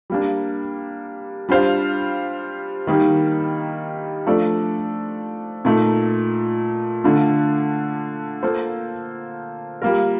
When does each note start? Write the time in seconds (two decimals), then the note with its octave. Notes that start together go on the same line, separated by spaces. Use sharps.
0.10 G3 A#3 D4
1.49 G3 D4 F4 C5 F5
2.87 D#3 G3 A#3 D#4
4.27 F3 A3 D4 A4 D5
5.65 A#2 A3 D#4 A4
7.04 D3 A3 D4 F4
8.43 A#3 F4 A4 C5
9.82 G3 A#3 F4 A#4